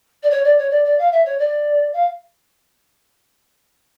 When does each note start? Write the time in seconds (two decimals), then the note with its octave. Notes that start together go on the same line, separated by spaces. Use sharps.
0.22 D5
0.30 C#5
0.44 D5
0.58 C#5
0.70 D5
0.84 D5
0.98 F5
1.12 E5
1.25 C#5
1.38 D5
1.93 F5